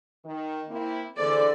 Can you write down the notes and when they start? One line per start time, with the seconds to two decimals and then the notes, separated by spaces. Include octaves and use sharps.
0.24 D#3
0.68 A#3 C4 E4
1.17 D3 E3 G#4 A4 C5 D5